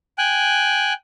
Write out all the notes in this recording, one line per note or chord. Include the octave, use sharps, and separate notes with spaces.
G5 G#5 F#6